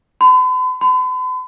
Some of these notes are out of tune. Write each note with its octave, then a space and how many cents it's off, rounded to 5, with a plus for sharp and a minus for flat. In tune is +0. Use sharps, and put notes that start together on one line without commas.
B5 +45
B5 +45